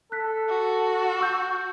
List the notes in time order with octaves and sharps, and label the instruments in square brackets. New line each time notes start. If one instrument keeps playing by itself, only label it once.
[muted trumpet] A4 [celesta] F#6 B6
[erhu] F#4
[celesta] C#6 E6 G6